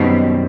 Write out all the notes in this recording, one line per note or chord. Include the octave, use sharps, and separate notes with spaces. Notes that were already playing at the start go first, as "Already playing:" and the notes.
Already playing: F#2 B2 D#3 G3 C4 D#4